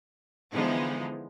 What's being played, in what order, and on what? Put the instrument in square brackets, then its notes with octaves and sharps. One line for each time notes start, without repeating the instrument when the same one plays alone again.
[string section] D3 E3 F3 G#3 B3 D#4